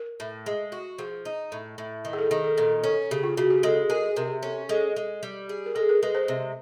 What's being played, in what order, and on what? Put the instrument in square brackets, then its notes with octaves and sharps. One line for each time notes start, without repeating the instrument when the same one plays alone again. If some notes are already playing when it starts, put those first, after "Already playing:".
Already playing: [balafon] A#4
[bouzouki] A2
G#3
F#4
[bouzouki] F3 [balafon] G#4
[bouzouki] D#4
A2
A2
D#3
[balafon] G#4
A4
[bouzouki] D#3 [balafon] G#4
[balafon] A4
[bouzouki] A#2 [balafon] A4
[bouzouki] C#4 [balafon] A4
[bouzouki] C#3 [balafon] G4
[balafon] F4
[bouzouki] C#3 [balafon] F#4
[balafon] G4
[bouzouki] G#3 [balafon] A4
[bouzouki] G#4 [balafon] A#4
[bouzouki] C3 [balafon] A#4
[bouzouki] C#4 [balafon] A4
[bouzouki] G#3 [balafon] A4
[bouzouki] G#3
G3
G#4
[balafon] A#4
[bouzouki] G#3 [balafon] A4
[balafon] A#4
[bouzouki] G#3 [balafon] B4
[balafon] C5
[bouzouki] C3